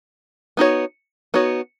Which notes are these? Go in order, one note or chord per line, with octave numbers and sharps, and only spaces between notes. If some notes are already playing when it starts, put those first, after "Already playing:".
B3 D#4 F#4 C#5
B3 D#4 F#4 C#5